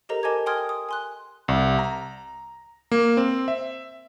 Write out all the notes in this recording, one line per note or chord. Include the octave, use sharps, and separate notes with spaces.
G4 A4 A#4 C5 D#5 A#5
A#4 D#5 G#5 A5 D6 G#6
G5 G#5 C6 D#6 F6 G#6
D#6
G#5 C6 F#6
C2
A#5
A#3
C4
E5